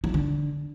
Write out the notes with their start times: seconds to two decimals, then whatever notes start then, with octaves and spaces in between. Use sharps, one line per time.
0.04 F#3
0.09 G3
0.14 D3